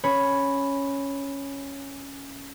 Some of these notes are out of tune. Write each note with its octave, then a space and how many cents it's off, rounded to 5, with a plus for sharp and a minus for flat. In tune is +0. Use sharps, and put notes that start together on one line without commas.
C#4 +0 C#5 +0 B5 +0